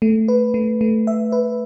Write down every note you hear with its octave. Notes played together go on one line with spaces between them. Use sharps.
A3
B4
A3
A3
E5
B4